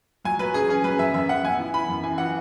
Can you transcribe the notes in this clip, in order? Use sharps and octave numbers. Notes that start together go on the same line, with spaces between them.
F#3 G#5
F#3 B4
C#4 G#4
C#4 G#4
F#3 B4
F#2 E5
F#2 E5
F#2 F#5
B3 G#5
E4
E4 B5
F#2
E3 G#5
E3 F#5